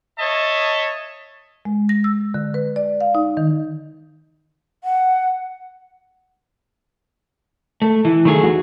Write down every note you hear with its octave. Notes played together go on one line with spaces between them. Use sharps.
C#5 D#5 E5 A5
G#3
A#6
E6
D3
B4
D5
F5
D#4
D#3
F#5
A3
E3
D#3 F#3 A3 G#4
E2 F#4